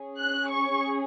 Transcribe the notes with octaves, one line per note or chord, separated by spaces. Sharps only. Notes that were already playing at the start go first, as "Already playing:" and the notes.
Already playing: C#4 G#4
F#6
C#6